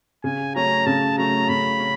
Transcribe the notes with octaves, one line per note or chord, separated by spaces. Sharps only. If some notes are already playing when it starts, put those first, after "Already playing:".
C#3 G#5
F#3 A3 C#4 A#5
C#3 A5
F#3 A3 C#4 A#5
C#3 B5
C#4